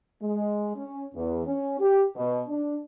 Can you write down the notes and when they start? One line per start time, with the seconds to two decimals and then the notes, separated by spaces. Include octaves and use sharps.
0.22 G#3
0.76 C#4
1.14 E2
1.45 C#4
1.80 G4
2.15 B2
2.48 D4